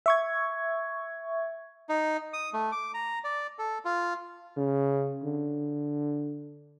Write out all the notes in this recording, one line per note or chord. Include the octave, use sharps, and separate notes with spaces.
E5 C#6 G#6
D#4
D#6
A3
D6
A#5
D5
A4
F4
C#3
D3